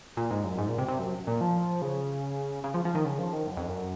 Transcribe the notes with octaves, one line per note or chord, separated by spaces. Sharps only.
A#2
G#2
F#2
G#2
A#2
C3
C3
F#2
A#2
F3
C#3
C#3
F3
F3
D#3
C#3
F3
D#3
F#2
F2
F#2